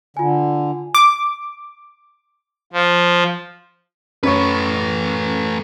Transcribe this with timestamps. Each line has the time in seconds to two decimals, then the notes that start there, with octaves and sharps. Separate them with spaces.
0.17 D3 F4 G#5
0.95 D6
2.73 F3
4.23 F#2 A3 B4 C#5 C#6